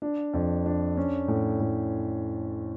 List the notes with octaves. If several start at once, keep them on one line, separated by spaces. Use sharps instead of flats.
D4
F2
D4
C#4
A2
A2